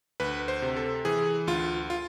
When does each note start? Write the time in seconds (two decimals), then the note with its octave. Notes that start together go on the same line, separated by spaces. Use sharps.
0.20 D2 B4
0.48 C5
0.62 C3
0.76 A4
1.05 E3 G#4
1.47 D2 F4
1.90 F4